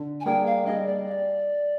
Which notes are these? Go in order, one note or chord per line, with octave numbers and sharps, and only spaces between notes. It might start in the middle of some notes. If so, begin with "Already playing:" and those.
Already playing: D3
G#5
G3 A#3 D4 G#4 G5
F5
G3 D4 G#4 D#5
D5